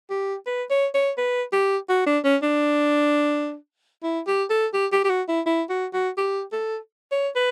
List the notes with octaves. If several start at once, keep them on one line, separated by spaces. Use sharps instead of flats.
G4
B4
C#5
C#5
B4
G4
F#4
D4
C#4
D4
E4
G4
A4
G4
G4
G4
F#4
E4
E4
F#4
F#4
G4
A4
C#5
B4